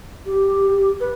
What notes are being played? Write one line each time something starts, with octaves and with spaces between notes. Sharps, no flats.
G4
B4